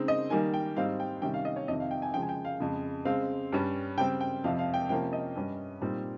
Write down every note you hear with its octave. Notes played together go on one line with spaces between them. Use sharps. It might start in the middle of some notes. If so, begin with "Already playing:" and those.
Already playing: C#3 G#3 C4 D#4
D#5
D#3 G3 A#3 D#4 G#5
G5
G#2 G3 C4 D#4 F5
G5
C3 D#3 G3 C#4 G5
F5
D#5
C#5
F2 C3 D#3 D#5
F5
G5
G#5
C#3 F3 G#3 G5
G#5
G5
F5
F2 C#3 G#3
C#3 G#3 C4 F5
G2 G3 C#4
C#3 G3 C4 G5
G5
F2 C3 F3 F5
F5
G5
C3 F3 A#3 C#4 G5
D#5
G2 G3 C#4
A#2 G3 C4 D#4